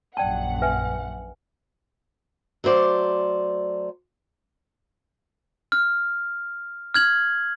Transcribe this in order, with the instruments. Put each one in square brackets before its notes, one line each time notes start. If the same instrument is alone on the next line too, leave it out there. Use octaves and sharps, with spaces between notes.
[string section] A#1 F#2 F#5 [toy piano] D5 G5 A5
[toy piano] B4 E5 G#5
[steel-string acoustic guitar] F#3 A3 C5 D5
[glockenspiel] F6
F6 G#6 F#7